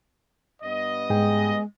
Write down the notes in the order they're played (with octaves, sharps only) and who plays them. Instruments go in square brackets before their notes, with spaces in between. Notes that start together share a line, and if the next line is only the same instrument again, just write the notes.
[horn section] G2 B3 D#5
[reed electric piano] G#2 G#4 G5 [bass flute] G#3